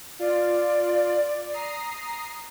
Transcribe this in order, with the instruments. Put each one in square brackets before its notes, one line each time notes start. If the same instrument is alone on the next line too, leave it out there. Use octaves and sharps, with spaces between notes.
[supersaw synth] F4 [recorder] D5
[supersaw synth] A#5 D#6 C7